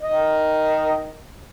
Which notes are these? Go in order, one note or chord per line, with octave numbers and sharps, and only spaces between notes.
D#3 D#5